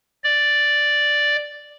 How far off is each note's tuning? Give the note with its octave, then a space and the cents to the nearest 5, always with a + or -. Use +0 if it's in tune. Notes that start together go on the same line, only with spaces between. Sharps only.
D5 +0